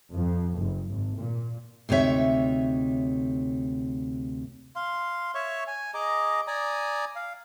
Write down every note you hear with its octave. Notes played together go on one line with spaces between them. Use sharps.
F2
F#1
G#1
A#2
D2 C3 D#4 C#5 E5
F5 C6
C#5 E5 C#6
G#5
G#4 D#5 A#5 D6
D5 G#5 A#5 D#6
F5